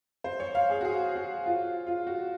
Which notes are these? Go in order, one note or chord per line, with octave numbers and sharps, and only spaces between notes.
C5
C#5
F5
G#4
F#4
G#4
F#4
F4
F4
F#4